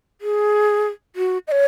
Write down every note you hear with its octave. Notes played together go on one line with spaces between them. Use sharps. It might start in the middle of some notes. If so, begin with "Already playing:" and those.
G#4
F#4
D#5
C#5